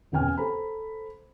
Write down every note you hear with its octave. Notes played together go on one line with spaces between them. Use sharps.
E1 C#3 B4 G5 G#5 F6
A4 C5 A#5 B5